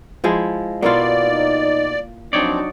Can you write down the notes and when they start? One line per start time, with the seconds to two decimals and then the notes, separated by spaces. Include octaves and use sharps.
0.24 F3 G#3 E4
0.83 B2 A#3 E4 F4 D5
1.21 D#4
2.33 F3 F#3 C4 D4 D#4 C#5 D5